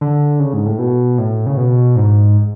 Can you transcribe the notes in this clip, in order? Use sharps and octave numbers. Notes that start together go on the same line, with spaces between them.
D3
C#3
G#2
A2
B2
A2
C#3
B2
G#2